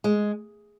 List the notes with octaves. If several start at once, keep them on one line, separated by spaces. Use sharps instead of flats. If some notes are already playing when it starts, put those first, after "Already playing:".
G#3